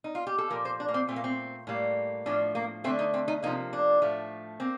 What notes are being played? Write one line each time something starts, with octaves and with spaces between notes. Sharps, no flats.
D#4
F4
G4
A4
A#2 F3 A#3 A#4
C5
D4
A#3
C4
A#2 A3 C4
A#3
C4
A2 G3 A#3
A2 F3 A3 D4
A#3
D3 A3 C4
D#4
C4
D#4
C3 F3 A#3 D#4
D4
A2 F3 A3
A#3 C4